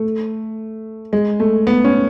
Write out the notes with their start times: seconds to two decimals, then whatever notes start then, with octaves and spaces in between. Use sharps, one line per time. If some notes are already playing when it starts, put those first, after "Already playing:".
Already playing: A3
1.13 G#3
1.40 A3
1.67 B3
1.84 C#4